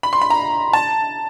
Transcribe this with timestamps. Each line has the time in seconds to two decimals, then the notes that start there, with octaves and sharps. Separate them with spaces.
0.03 B5
0.13 C6
0.22 B5
0.30 A#5
0.73 A5